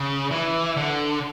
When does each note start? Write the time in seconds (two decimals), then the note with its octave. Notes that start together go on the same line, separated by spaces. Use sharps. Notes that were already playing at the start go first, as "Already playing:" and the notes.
Already playing: C#3
0.31 E3
0.77 D3